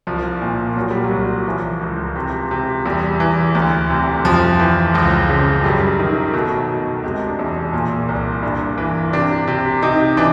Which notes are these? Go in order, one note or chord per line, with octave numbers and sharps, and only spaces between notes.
C2 F3
A#2
A#2 F#3
G3
F#3
C2
E3 F3
C#2
C3
C3
E2 G3
E3
D2
C3
F2 F3
E3
C#2 F3
C#3
F#2 G3
D#3
B2 A3
B2
C3 G#3
D4
E2
A#2
C2
G2
E3
C3 D4
C3
C3 D#4
E3 D4